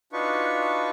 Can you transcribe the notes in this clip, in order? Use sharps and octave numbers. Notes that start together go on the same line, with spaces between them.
D4 D#4 F4 F#4 B4 C#6